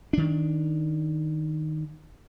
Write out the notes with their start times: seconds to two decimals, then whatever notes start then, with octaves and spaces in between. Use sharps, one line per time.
0.13 D#3 D4